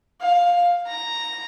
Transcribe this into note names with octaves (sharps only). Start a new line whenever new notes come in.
F5
A#5